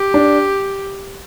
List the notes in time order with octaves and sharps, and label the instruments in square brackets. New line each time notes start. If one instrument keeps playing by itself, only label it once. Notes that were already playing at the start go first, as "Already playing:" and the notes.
Already playing: [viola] G4
[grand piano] D4